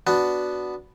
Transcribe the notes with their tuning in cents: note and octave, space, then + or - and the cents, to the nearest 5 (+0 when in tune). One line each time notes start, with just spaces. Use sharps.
B3 +0 D4 -5 F#4 +0